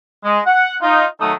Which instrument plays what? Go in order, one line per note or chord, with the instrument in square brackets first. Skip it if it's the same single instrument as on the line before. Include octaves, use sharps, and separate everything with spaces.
[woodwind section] G#3
F#5
D#4 F4
D#3 F#3 A3 D#4 A4 D#6